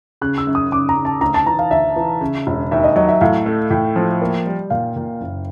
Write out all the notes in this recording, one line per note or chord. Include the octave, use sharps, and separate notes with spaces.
C#3 F#6
E6
F#2
D#6
C#3 D6
A#5
C#3
A5
D2 A#5
A5
E3 A#5
F5
D2 E5
E3
C#3
E1
D#2 E5
D#5
F#3 D#5
E5
A2 F5
A3
A2 G5
F3
A#3
G3
A#2 F5
A#2
F#1